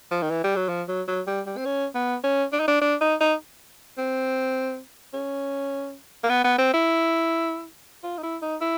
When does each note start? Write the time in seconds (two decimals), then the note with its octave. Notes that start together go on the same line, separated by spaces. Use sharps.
0.11 F3
0.22 D#3
0.31 E3
0.44 G3
0.56 F#3
0.69 F3
0.88 F#3
1.08 F#3
1.27 G3
1.47 G3
1.57 C4
1.65 C#4
1.95 B3
2.24 C#4
2.53 D4
2.60 D#4
2.68 D4
2.81 D4
3.01 D#4
3.21 D#4
3.98 C4
5.14 C#4
6.24 A#3
6.29 B3
6.44 B3
6.58 C4
6.74 E4
8.04 F4
8.18 D#4
8.23 E4
8.42 D#4
8.61 E4